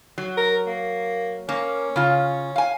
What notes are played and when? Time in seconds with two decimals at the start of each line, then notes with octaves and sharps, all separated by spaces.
0.18 F#3
0.37 A#4
0.67 A#3
1.49 A#3 C#4
1.96 C#3 F4
2.56 F5 G#5